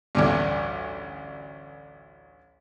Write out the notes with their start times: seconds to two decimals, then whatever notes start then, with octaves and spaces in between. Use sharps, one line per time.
0.15 A1 D2 G2